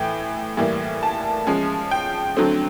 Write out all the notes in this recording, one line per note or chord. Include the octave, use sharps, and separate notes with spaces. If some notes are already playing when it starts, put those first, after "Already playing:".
Already playing: A2 E3 G5
A2 E3 G3 A#3
A5
F3 G#3 C#4
G5
D3 F#3 A3 C4